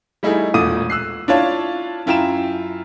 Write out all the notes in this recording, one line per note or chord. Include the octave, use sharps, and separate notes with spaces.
G3 A3 D#4 E4 G#4
E1 A#2 A3 D6 D#6 D#7
E6 F#6 C7
D4 E4 F4 C#5 F5 A5
F#2 E4 F4 G5 A#5 E7